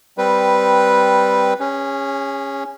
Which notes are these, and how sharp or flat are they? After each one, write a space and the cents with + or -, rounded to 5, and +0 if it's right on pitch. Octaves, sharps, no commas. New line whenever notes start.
G3 +0 C4 -10 B4 -5
C#4 -5 G#4 -35